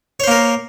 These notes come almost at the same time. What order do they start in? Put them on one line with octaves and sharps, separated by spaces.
C#5 C5 A#3 A#4